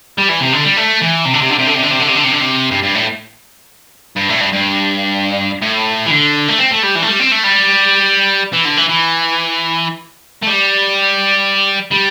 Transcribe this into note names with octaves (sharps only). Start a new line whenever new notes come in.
G3
E3
C3
D3
G3
A3
E3
C3
D3
C3
D3
C3
D3
C3
D3
C3
D3
C3
D3
C3
D3
C3
G2
G2
A2
G2
A2
G2
G2
A2
E3
D3
A3
C4
A3
G3
E3
A3
G3
C4
A3
G3
E3
D3
E3
E3
A3
G3
G3